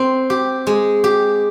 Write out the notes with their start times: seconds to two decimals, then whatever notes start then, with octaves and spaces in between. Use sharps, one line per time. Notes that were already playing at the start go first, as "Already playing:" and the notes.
Already playing: C4
0.30 G4
0.67 G#3
1.04 G4